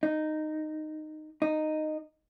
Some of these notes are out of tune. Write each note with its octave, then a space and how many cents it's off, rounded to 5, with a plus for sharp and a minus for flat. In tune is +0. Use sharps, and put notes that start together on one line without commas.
D#4 -10
D#4 -10